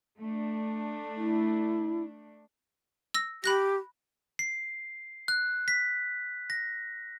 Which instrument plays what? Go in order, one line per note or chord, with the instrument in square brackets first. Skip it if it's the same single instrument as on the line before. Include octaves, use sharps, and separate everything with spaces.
[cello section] A3 D4
[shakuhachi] E4
[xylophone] E6 A#6
[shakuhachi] G4 [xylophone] B5 F#6 A#6
[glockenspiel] C7
F#6
B6
A#6